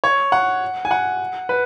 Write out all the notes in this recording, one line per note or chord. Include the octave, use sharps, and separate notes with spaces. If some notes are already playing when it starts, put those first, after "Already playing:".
C#5
F#5
G#5
F#5
B4